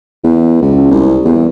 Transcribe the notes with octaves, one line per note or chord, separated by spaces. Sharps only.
E2
C#2
C2
E2